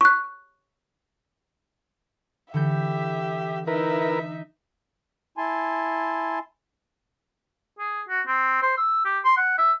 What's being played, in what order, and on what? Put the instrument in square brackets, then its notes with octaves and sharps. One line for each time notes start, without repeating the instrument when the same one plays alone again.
[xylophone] C#6 F#6
[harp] D3 E3 G6 [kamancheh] G4 E5
[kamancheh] D#4 E5 [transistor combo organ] E4 A#4 B4
[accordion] E4 G#5 A5 C6
[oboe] G#4
F#4
C4
C5
E6
G4
C6
F#5
E5